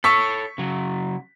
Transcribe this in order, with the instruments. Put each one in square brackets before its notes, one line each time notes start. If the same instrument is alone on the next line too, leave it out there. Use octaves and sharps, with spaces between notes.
[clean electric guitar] A4 C#5 [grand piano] C#6 E6 B6
[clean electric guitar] C#3 F#3